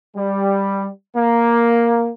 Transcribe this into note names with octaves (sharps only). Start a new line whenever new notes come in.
G3
A#3